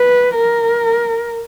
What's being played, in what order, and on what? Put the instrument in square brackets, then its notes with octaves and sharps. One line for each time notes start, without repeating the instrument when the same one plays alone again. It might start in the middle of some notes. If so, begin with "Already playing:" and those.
Already playing: [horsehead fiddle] B4
A#4